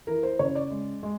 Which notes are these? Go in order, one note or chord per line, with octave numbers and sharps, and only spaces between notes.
E3 A#4
C5
C#3 C#5
D5
G#3
G#3